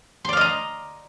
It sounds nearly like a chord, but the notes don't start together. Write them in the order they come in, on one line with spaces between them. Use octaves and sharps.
C6 D5 F5 D#5 A#5